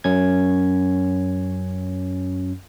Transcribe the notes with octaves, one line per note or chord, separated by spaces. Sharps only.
F#2 C#4 G#6